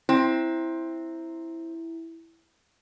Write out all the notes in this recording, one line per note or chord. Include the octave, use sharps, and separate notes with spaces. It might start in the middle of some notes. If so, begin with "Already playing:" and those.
C4 E4